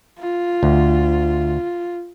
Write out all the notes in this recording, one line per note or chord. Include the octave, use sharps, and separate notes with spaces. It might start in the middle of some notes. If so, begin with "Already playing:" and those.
F4
D2